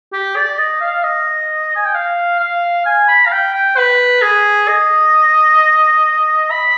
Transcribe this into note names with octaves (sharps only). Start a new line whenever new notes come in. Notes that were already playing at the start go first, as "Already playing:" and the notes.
G4
D5
D#5
F5
D#5
G#5
G5
F5
F5
G#5
B5
F5
G5
G5
B4
G#4
D#5
B5